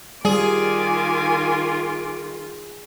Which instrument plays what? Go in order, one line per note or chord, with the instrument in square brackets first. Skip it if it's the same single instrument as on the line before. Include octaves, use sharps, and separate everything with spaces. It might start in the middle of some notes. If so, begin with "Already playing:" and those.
[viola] D#3 F4 [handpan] G3 [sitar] G#4 [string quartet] G#5 D6